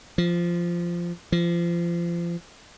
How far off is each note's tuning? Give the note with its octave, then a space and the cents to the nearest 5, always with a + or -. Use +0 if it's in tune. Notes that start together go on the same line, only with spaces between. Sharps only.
F3 -10
F3 -30